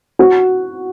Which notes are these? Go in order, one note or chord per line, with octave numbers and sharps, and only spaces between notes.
F#4